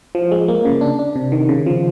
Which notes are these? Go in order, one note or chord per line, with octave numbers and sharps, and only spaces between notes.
F3
G#3
A#3
C#3
D4
D4
C3
D#3
C#3
F3